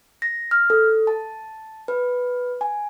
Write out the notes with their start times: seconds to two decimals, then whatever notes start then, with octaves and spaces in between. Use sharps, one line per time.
0.22 A#6
0.51 F6
0.70 A4
1.07 A5
1.88 B4
2.61 G#5